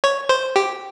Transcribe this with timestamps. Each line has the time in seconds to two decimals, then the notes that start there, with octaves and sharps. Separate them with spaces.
0.04 C#5
0.29 C5
0.56 G4